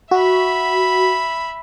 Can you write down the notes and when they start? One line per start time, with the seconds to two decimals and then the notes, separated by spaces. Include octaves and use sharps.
0.11 F#4 E5 B5